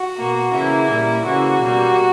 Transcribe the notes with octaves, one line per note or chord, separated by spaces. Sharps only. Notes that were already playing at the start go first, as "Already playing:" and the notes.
Already playing: F#4
B2 A#3
C#3 E3 A#3 E4
A#2 G3 A#3
C#3 E3 A#3 F#4
B2 G3 A#3